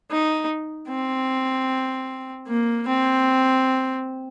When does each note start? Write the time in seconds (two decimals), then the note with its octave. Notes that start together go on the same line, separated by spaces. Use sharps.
0.11 D#4
0.89 C4
2.48 A#3
2.87 C4